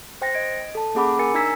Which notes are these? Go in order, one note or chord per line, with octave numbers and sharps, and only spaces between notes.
C5 G5 A6 A#6
D#5 G#6 D7
A4 A5
A#3 C#4 G#4 F#5 B5 D6
A#4 G#5 A6 C#7
D4 D#4 A#5 E6 G#6 B6